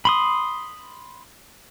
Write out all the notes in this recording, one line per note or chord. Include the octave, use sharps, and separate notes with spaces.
B5 C6 D#6